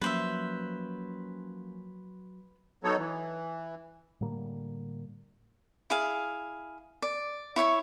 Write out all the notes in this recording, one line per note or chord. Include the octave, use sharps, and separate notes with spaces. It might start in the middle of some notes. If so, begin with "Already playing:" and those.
F3 F#3 A#3 C#4 B4 C5 E5
F#3 B3 D#4 A4 C#5
E3
A2 D3 G3 A#3
E4 G#4 F5
D5
E4 C#5 E5 C#6